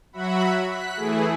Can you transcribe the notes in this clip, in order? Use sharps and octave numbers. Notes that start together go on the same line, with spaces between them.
F#3 F#4 E5 F#5 B5
F#6 B6
E3 A3 E4 G#4